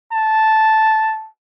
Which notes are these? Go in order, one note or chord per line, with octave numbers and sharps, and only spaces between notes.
A5